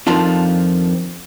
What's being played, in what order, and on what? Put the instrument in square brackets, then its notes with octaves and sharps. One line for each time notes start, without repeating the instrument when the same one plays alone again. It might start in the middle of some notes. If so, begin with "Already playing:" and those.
[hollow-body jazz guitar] F2 D#3 F3 D4 F4